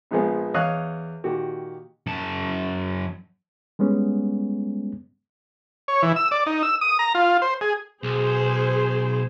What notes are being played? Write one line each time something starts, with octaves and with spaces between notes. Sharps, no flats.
A#1 A#2 F3 G#3 B3 C5
E2 C#5 D#5 F5 D#6 F#6
A#2 D#3 F#4 G4
F#2 A5
G3 G#3 B3 C#4
C#5
E3
E6
D5
D#4
E6
D#6
A#5
F4
C5
G#4
B1 G#4 C5